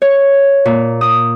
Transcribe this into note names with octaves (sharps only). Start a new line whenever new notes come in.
C#5
A#2
D#6